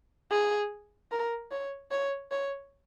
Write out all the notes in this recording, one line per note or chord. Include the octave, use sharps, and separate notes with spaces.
G#4
A#4
C#5
C#5
C#5